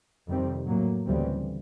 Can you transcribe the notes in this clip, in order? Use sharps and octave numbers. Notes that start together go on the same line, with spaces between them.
F2 C3 D#3 G3 C4
A2 F#3 A#3
D2 C#3 E3 G3 C4